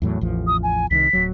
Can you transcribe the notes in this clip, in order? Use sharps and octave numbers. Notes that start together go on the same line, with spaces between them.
E2 A2 F#3
A1 E2 F3
D#6
G#5
C2 D#3 B6
D1 F#3